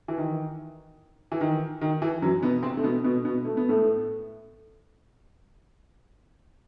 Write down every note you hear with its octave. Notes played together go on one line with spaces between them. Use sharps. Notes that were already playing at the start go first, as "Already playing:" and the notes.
E3
D#3
E3
D#3
D#3
E3
F#2 F#3
B2 B3
C3 C4
A3
B2 B3
B2 B3
B2 B3
A3
B3
A2 A3